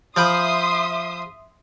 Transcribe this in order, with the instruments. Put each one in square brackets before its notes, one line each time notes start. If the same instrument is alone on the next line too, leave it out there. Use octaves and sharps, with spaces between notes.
[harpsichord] F3 G5 B5 [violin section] E5 C6 D#6